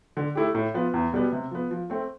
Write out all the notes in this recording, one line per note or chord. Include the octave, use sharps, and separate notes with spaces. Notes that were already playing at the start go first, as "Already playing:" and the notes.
D3
A3 E4 G4
A2
F3 B3 F4
E2
B2 G3 B3
C3
F3 B3
F3
A3 C4